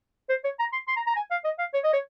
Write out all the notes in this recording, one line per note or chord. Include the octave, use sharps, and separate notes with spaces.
C5
C#5
A#5
C6
C6
A#5
A#5
G#5
F5
D#5
F5
C#5
D#5
C#5